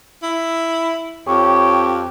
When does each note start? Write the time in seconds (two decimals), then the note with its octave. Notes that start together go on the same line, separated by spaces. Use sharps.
0.23 E4
1.27 F2 G4 C#5